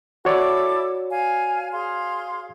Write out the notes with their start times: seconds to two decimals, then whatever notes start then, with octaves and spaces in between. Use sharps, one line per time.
0.25 E4 F#4 A4 C#5 D5 D6
1.12 F5 G#5
1.73 G#4 F5 C6